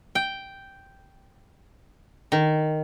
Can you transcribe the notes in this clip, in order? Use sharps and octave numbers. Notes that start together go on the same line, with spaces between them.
G5
D#3